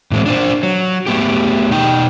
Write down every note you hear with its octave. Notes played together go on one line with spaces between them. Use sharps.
A2 E3 G#3 C4
D4 F4 C5
F#3
A3 B3 G4
B2 D#4 G5